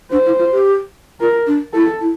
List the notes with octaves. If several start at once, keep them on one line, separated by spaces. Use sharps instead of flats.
D4 C5
E4
F4
G4
F4 A#4
D4
E4 A4
E4